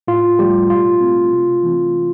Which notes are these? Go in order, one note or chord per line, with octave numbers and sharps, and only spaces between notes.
A2 F4
F3 G3 A3 G4
B2 F4
A3 C4
C3
E3 A3 C4